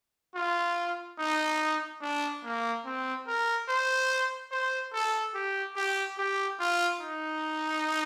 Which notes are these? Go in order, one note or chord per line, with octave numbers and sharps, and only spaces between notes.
F4
D#4
D4
A#3
C4
A#4
C5
C5
A4
G4
G4
G4
F4
D#4